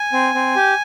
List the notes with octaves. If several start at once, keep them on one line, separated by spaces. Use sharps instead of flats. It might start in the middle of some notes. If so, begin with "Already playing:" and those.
Already playing: G#5
C4
C4
G4